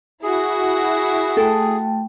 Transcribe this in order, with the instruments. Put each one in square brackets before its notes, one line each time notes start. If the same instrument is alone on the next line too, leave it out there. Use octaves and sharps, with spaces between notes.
[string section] E4 F#4 [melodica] G#4
[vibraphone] A3 G5 [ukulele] A4